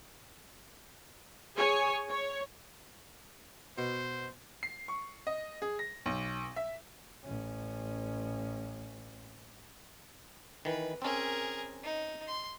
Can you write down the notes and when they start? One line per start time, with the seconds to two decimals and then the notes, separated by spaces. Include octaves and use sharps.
1.55 G#4 C#5 G#5
2.10 C#5
3.78 B2 C5
4.63 C7
4.88 C#6
5.27 D#5
5.62 G#4
5.79 A#6
6.06 B1
6.56 E5
7.25 A1 C#4
10.65 D#3 E3 B4
11.02 C4 C#4 G#4 A#4
11.84 D#4
12.27 C6